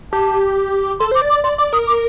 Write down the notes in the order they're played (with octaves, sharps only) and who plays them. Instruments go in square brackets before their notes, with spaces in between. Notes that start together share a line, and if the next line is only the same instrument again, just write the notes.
[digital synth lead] G4 [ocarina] A5
[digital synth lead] A4 [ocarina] C6
[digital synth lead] C5 [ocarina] D6
[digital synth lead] D5
[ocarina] D6
[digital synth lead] D5
[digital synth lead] D5 [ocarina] C6
[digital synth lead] D5 [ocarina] D6
[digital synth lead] A#4 [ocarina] D#6
[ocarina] D6